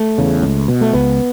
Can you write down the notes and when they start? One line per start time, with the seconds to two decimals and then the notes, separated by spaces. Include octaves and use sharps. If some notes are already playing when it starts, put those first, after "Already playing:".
Already playing: A3
0.18 E2 C#3
0.42 C#2
0.68 B2
0.81 A3
0.93 C#2 B3